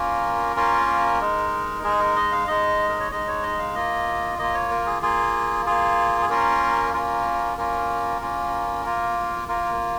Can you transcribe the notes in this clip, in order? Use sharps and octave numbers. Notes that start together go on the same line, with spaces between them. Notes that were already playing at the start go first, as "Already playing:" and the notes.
Already playing: A#3 C#4 F4 A#4
A#3 C#4 F4
G#3 D#4
G#3 D#4 G#4
A#4
D#5
F5
G#3 D#4 D#5
A#4
C#5
G#3 D#4 D#5
C#5
D#5
F5
A#3 F4 D#5
A#3 F4 D#5
C#5
A#4
G#4
A#3 F4 G#4
A#3 F4 G#4
G#4
A#3 C#4 F4 A#4
A#3 C#4 F4 A#4
A#3 C#4 F4 A#4
A#3 C#4 F4
A#3 F4
A#3 F4 A#4